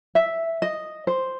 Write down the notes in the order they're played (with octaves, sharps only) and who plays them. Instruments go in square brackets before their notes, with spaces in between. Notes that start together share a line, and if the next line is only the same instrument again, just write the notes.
[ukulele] E5
D#5
C5